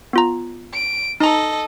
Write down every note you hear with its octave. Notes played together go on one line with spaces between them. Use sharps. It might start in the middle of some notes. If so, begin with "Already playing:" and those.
B3 F4 A#5
D7
D#4 A4 D#5 A#5